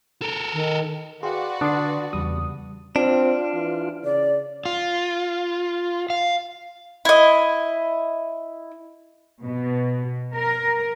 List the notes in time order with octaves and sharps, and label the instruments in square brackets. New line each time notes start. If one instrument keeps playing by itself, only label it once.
[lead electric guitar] A4 A#4
[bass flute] D#3
[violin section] F#4 B4 D5 [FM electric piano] G#4 [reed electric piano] F5 G5 C6
[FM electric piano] D3 C6 A6 [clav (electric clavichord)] D4 [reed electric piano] D#6
[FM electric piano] E2 D#6 [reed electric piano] C#3 G3
[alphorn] C4 [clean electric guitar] D4 [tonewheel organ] F4
[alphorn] E3
[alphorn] C#3 [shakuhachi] D5
[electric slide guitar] F4
F5
[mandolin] E4 D#5
[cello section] B2
A#4